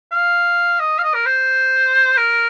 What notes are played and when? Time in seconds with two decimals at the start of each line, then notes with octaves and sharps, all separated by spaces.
0.11 F5
0.80 D#5
0.99 F5
1.03 D#5
1.14 A#4
1.26 C5
2.17 A#4